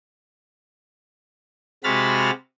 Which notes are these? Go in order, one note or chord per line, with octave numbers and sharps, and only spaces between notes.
C3 G#3 F#4 B5 F6 A6